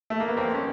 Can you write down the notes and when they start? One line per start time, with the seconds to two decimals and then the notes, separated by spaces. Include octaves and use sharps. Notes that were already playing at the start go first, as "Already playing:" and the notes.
0.10 A3
0.20 A#3
0.28 B3
0.37 F2 A#3 C4
0.55 C#4